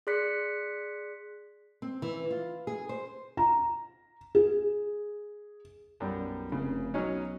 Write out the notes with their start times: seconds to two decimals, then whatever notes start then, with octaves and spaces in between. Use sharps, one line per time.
0.07 G#4 D5 C6 F#6 B6 C#7
1.82 C4
2.02 E3
2.31 F4
2.67 G#4
2.89 C5
3.37 A#5
4.35 G#4
6.00 B1 F#2 G3
6.52 F1 C#3
6.94 B1 F#3 C#4 D#4